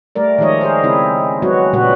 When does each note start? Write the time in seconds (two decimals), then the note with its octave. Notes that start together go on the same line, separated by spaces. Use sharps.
0.15 G3 A3 A#4 D5
0.38 D#3 F3 G#3 G4 C#5 D#5
0.61 G#4 A#4 C5
0.83 C#3 G#3 C4 E4
1.42 F#3 G#3 B3 F#4 C#5
1.73 A#2 C#3 G3 F#4 B4